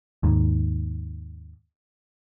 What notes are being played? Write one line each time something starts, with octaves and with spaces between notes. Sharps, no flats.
D#2 G#2